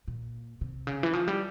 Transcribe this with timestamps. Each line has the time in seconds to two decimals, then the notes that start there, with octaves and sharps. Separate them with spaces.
0.08 A#2
0.61 C3
0.87 C#3
1.03 E3
1.13 F3
1.28 G3